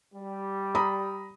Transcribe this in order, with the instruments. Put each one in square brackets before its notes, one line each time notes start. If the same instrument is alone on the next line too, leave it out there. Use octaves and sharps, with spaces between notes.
[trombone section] G3
[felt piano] A#5 B5 D#6